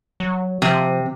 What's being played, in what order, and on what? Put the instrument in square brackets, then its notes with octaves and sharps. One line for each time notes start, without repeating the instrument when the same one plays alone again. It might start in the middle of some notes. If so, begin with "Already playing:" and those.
[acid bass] F#3
[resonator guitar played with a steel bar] C3 [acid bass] F3